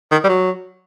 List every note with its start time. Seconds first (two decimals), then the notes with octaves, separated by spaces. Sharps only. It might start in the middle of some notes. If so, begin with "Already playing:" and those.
0.11 D#3
0.24 G3
0.29 F#3